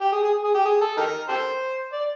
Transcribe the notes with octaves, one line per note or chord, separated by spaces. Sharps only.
G4
G#4
G#4
G#4
G4
G#4
A4
D#4 G4 A#4
G4 A4 C5
D5